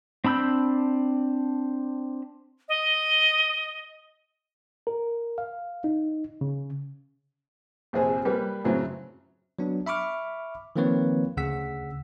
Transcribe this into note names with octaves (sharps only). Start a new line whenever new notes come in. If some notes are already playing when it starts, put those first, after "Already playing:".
C4 D4 B5 E6 G6
D#5
A#4
F5
D#4
C#3
A#1 F2 C3 C4 G#4
G3 A#3 B4
F#2 A2 C#3 F#3 C4
F#3 B3 D4
E5 B5 C#6 D6 F6
D#3 F3 A#3 C4 B4 C#5
D2 C#3 F#5 E6 B6